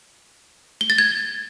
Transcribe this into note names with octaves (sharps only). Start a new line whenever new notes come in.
G7
A6
G#6